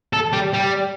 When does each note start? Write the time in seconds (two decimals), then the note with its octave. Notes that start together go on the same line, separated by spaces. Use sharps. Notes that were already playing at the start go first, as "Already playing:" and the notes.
0.13 A4
0.33 G3
0.54 G3